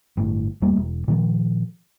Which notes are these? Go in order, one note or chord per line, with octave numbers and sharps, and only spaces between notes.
G1 A2
E2 G3 A3 A#3
E1
A#2 D#3 F3